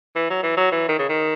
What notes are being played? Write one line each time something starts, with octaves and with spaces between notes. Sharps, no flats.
E3
F#3
E3
F#3
E3
D#3
C#3
D#3